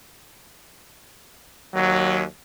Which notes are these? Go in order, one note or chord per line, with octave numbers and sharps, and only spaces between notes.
D#2 F#3